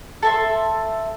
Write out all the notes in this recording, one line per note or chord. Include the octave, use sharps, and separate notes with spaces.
A4 E5 C6